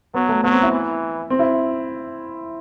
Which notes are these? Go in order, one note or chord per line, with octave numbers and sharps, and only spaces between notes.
F#3 B3
A3
F#3 B3
C4
E4
E3
C4
E4